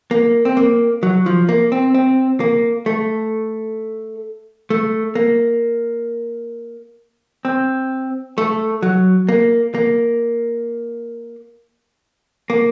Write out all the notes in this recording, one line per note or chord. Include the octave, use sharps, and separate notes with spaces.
A#3
C4
A#3
F#3
F3
A#3
C4
C4
A#3
A3
A3
A#3
C4
A3
F#3
A#3
A#3
A#3